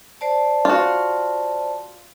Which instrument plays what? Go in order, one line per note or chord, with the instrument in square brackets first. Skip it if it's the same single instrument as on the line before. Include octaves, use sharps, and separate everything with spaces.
[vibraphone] C5 D5 A5
[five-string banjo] F4 F#4